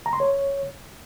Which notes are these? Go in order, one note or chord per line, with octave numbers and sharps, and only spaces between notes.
A#5
C6
C#5